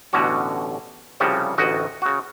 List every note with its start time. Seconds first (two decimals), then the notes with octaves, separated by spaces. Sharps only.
0.13 A1 B2 D3 C#4 F#4
1.20 C2 C#3 F3 G3 F#4
1.58 A1 D2 F#4 D#5
2.02 C#3 F#4